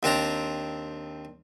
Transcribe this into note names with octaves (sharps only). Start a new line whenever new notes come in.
D#2 C4 D4 A#5